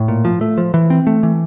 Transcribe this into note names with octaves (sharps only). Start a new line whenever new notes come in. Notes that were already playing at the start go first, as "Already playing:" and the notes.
Already playing: A2
A#2
F3
A3
F3
E3
C4
A3
E3